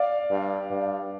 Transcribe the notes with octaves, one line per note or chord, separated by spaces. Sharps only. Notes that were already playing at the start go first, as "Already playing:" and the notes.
Already playing: D5 F5
G2
G2